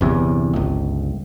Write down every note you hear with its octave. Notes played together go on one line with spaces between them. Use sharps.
G1 E2 C3
G1 C#2